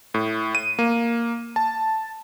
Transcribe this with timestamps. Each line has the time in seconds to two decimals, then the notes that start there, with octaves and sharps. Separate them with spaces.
0.14 A2
0.55 D#7
0.79 A#3
1.56 A5